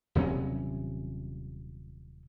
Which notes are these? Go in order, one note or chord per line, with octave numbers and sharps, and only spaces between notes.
D#1 C3 F#3 C#4